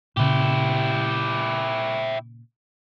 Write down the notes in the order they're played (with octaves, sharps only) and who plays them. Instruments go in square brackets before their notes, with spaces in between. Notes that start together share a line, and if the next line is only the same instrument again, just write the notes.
[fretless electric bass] A#2 C#3 [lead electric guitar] E4 G4